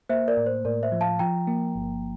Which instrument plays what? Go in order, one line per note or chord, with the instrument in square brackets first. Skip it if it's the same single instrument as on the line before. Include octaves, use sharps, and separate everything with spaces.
[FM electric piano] A#3 [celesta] C5 E5
[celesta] A#4 D5
[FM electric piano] A2
[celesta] C5
[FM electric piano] A2 [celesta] A#4 D5
[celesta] C5 E5
[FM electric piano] F3
[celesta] F5 A5
[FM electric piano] F3 [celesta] G5 A#5
[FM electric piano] A#3
G1